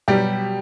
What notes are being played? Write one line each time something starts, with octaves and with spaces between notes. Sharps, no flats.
B2 F#3 G3 G4